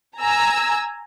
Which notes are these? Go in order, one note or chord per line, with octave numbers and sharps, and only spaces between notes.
G#5 A#5 E6